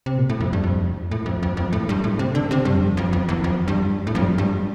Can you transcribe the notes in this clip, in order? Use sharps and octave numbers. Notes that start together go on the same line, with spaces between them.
C3
A#2
A2
F2
G2
F2
A2
F2
F2
F2
A2
G2
A2
C3
D3
C3
G2
F2
F2
F2
E2
F2
G2
A2
F2
G2
G2